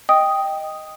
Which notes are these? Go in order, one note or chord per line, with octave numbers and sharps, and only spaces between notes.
D#5 G5 D#6